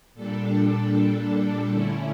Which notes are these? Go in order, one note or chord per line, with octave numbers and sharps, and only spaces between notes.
A#2 G3 D4 A4
D3 A3 C#4 E4